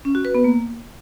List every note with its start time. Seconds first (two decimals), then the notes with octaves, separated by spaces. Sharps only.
0.05 C#4
0.15 F#4
0.25 B4
0.34 B3
0.44 A#3